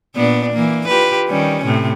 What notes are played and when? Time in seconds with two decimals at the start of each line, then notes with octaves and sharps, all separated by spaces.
0.16 A#2 B3 D4
0.53 E3 A#3
0.88 F4 G4 B4
1.28 D#3 G3 C#4
1.65 A2 C3